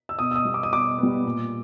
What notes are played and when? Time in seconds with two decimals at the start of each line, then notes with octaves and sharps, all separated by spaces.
0.09 E6
0.19 B2 D#6
0.31 E6
0.36 D#6
0.45 G3 B3
0.54 D6
0.63 D#6
0.72 B2 D6
0.98 G3 B3
1.25 A#2